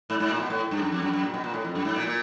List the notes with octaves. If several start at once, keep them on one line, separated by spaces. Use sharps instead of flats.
G#2
G#2
A#2
B2
A2
G2
F#2
F2
F#2
F#2
A#2
B2
A#2
A2
F2
F#2
G#2
A#2
A#2